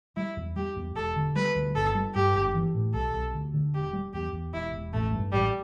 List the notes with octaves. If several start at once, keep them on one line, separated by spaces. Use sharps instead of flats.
G3 E4
E2
G3 G4
E2
E1 A4
D3
G3 B4
D2
G1 A4
G3
G2 G4
G1
E3
A2
B1 A4
B1
D2
D3
E1 G4
G3
E2 G4
E2
E1 E4
E1
A1 A3
G2
A1 G3